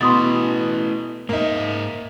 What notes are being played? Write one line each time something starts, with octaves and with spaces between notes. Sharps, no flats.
B2 A3 E4 B4 C6 D#6 A6
G#2 A#3 D#4 C5 E5